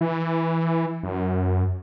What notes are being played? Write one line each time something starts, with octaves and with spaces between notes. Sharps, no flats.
E3
F#2